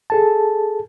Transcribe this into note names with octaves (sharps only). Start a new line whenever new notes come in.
G#4 A4 A5